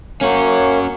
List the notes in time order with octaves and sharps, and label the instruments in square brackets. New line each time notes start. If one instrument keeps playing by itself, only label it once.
[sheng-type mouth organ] A#3 C#5 [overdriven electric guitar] C#4 F#4